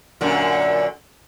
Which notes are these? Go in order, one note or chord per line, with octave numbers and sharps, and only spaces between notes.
F#2 A#2 D3